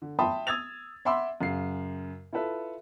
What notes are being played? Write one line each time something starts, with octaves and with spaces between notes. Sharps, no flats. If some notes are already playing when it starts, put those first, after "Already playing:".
D3
E5 G5 A5 B5 C6 D#6
D#6 E6 G#6 A6 F7
E5 F#5 B5 C6 D6 E6
F#2 C#3 F5 C7
E4 F4 A4 B4 E5